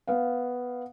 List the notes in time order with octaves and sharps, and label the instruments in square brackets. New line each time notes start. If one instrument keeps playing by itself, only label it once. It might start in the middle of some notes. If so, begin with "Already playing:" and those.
[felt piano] B3 F5